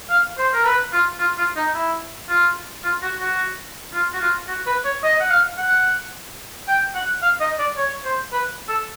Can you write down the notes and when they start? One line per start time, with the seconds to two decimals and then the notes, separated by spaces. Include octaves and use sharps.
0.10 F5
0.38 C5
0.53 A#4
0.65 B4
0.92 F4
1.20 F4
1.38 F4
1.56 D#4
1.75 E4
2.29 F4
2.84 F4
3.02 F#4
3.21 F#4
3.94 F4
4.14 F#4
4.21 F4
4.48 F#4
4.67 B4
4.85 C#5
5.04 D#5
5.20 F#5
5.31 F5
5.58 F#5
6.68 G5
6.95 F#5
7.22 F5
7.40 D#5
7.59 D5
7.77 C#5
8.04 C5
8.32 B4
8.69 A4